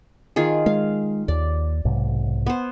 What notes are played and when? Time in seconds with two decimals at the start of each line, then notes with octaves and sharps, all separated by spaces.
0.36 D#3 F4 G#4
0.66 G#3 F5
1.28 D#2 D5
1.85 B1 G#2 C3
2.46 B3 C5